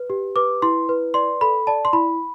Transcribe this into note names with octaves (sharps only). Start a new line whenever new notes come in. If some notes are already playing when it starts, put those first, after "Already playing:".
Already playing: B4
G4
B4 D6
E4 C6
B4
D5 C6
A4 B5
D5 A5
C6
E4 B5